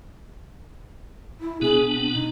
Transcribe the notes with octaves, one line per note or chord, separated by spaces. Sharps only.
E4
B2 B3 D4 G#4
C4
D#4